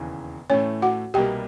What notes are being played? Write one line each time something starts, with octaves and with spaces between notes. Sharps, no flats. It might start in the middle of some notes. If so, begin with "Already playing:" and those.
Already playing: E1 D#2 C#3 E3
A2 E3 A3 C#4 C#5
F#4 F#5
C2 B2 G3 A#3 G4 G5